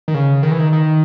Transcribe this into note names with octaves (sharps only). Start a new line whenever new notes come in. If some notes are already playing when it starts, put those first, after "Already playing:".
D#3
C#3
D#3
E3
D#3
D#3